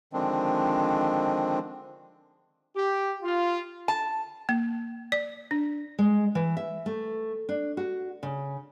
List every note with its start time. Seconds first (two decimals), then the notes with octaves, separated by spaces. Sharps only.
0.13 D3 D#3 F3 G#3 C4 D4
2.75 G4
3.23 F4
3.88 A5
4.49 A#3
5.12 D5
5.51 D4
5.99 G#3
6.35 E3
6.57 E5
6.86 A3
7.49 D4
7.77 F#4
8.23 C#3